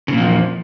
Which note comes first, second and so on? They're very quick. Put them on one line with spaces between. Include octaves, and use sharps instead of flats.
C#3 A#2 F3 E2